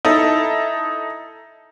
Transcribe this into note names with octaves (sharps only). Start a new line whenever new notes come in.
D#4 E4 A4